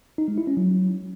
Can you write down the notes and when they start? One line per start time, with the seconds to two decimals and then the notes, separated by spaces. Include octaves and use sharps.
0.18 D#4
0.28 G#3
0.38 E4
0.47 C#4
0.57 F#3